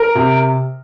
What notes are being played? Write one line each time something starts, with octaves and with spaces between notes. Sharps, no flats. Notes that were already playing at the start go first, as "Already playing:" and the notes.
Already playing: A#4
C3